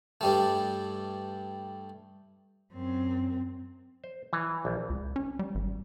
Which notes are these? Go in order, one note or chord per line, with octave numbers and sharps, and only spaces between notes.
G2 G3 A3
F#2 C4
C5
E3
A#1
C#2
C#4
G3
G#1